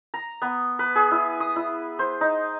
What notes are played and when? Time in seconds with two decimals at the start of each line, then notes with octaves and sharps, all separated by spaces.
0.14 A#5
0.42 B3
0.79 B4
0.96 G#4
1.11 E4
1.40 D#6
1.56 E4
1.99 C5
2.21 D#4